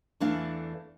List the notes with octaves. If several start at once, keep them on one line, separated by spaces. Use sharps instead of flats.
E2 E3 A3 D4 F5